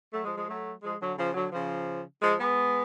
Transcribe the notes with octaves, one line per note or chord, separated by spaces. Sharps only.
F#3 A3
F3 G#3
F3 G#3
F#3 A3
F3 G#3
D3 F#3
C#3 F3
D3 F#3
C#3 F3
F3 G#3
G#3 B3